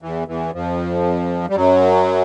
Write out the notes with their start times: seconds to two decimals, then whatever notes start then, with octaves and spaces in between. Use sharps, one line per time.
0.02 E2 E3
0.28 E2 E3
0.53 F2 F3
1.50 G3
1.56 F#2 F#3